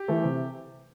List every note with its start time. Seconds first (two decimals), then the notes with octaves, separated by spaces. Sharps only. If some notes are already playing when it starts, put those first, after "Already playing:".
Already playing: G4
0.08 E3 A3
0.24 C3